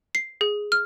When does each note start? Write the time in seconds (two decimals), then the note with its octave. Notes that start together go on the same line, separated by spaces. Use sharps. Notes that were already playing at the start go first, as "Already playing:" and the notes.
0.15 C7
0.41 G#4
0.72 F6